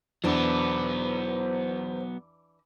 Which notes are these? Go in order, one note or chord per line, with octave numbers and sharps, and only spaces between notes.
E2 E3 F#3 B3 D4 C5